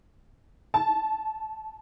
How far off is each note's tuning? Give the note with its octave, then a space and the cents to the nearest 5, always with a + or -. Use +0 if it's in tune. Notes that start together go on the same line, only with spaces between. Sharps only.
A5 -25